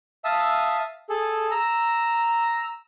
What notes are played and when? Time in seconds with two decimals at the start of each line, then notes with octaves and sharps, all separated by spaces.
0.25 E5 F5 A5 D#6 E6
1.10 G#4 A4
1.51 A#5 E6